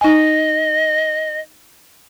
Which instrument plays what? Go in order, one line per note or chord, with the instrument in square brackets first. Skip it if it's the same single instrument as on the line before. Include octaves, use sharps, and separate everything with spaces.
[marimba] D#4 G#5 [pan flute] D#5